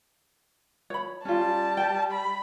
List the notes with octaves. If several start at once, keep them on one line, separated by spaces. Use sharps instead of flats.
C#5 B5
G3 C#4 F4 A5
G5
B5